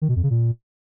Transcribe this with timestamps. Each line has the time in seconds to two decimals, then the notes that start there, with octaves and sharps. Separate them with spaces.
0.02 D#3
0.09 B2
0.16 F2
0.23 C#3
0.30 A#2